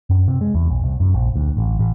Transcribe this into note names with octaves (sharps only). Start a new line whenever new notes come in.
F#2
C3
G#3
E2
B1
C2
F#2
A#1
D2
A1
A1